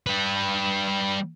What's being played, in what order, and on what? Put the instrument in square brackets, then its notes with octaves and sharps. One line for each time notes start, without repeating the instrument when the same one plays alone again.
[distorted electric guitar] G3 B4